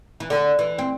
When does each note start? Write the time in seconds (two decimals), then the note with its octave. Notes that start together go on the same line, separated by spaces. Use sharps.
0.20 E3
0.30 D3
0.59 E3
0.78 C4